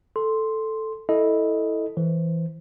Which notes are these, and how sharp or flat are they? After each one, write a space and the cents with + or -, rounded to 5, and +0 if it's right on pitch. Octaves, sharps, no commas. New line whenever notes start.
A4 +0 C6 +0
E4 -10 A4 +0 D#5 +0
E3 +0 C5 +0